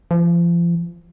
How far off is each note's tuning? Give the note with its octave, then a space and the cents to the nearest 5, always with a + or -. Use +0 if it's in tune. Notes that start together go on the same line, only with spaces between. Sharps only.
F3 -35